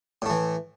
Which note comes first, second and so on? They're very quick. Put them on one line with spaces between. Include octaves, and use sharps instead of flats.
A2 A3 E3